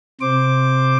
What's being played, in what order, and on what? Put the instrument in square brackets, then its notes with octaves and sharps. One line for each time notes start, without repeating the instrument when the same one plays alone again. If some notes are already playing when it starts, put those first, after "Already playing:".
[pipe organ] C3 C5 D6